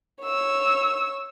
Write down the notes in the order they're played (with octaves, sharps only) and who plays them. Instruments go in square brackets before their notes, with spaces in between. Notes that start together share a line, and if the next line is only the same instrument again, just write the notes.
[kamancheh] C#5 E6